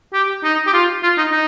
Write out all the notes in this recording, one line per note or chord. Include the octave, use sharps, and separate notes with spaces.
G4
D#4
G4
F4
F4
D#4
D#4